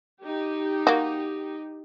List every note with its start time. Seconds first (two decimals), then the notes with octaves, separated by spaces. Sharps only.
0.21 D#4 G4
0.87 A#3 F#4